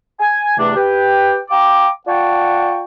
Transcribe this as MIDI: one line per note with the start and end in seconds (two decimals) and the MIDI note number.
0.20 0.55 80
0.57 0.73 40
0.57 0.73 43
0.57 0.73 48
0.57 0.73 57
0.57 0.73 62
0.76 1.38 67
0.76 1.38 71
0.76 1.38 79
1.50 1.89 77
1.50 1.89 79
1.50 1.89 82
1.50 1.89 86
2.07 2.83 65
2.07 2.83 74
2.07 2.83 78
2.07 2.83 79
2.07 2.83 81
2.07 2.83 85